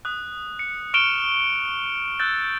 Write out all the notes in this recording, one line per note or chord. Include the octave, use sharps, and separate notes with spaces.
D#6 F#6
C#7
C#6 F6 D7 E7 F7 G7
E6 F#6 G6 A6